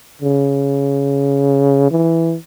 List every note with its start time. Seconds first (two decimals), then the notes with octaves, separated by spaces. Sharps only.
0.22 C#3
1.91 E3